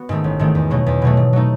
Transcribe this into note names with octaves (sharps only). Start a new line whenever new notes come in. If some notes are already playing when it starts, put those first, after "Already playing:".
Already playing: B3 F#4
G#2 D#3 A3
A1
G#2 D#3 A3
E2
B2 F#3 A3
E2
B2 F#3 A3
G#2
F#3 A3 D#4